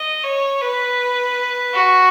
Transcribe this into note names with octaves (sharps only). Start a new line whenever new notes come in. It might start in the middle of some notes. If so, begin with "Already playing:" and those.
Already playing: D#5
C#5
B4
F#4